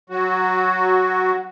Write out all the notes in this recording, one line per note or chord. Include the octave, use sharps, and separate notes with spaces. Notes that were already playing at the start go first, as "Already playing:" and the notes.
F#3 F#4